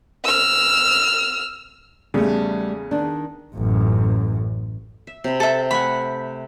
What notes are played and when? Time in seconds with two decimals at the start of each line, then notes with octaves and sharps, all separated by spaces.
0.25 E6 F6
2.14 E2 C#3 G3 A3
2.91 D#3 D4
3.55 A1 F#2
5.07 E5
5.24 C3 B5
5.40 A4 E5
5.71 A3 F#5 G#5 B5